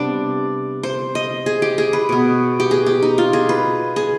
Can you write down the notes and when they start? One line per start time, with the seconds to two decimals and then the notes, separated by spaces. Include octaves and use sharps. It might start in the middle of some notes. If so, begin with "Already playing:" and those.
Already playing: C3 G3 B3 D4
0.83 C5
1.15 D#5
1.46 G#4
1.62 G4
1.78 G#4
1.93 B4
2.09 B2 B3
2.60 G4
2.71 G#4
2.86 G4
3.02 D#4
3.18 F4
3.33 G#4
3.49 B4
3.96 G#4